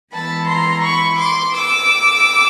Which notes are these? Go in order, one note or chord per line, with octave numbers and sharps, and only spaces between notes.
E3 G#3 B3 E4 A5 B5
A#5 C6
B5 C#6
C6 D6
D6 E6